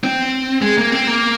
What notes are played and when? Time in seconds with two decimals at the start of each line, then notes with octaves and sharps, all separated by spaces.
0.04 C4
0.62 G#3
0.78 A#3
0.92 C4
1.07 A#3